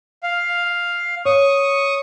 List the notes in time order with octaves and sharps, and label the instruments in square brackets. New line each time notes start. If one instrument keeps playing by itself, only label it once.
[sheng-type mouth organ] F5
[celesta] C#5 [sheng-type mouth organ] C#6 D#6